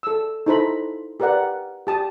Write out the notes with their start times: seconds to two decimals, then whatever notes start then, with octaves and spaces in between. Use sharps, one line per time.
0.03 A4 E6
0.46 D#4 E4 A4 C5 A#5 B5
1.20 G4 A#4 B4 D5 F#5
1.87 G4 A5 D#6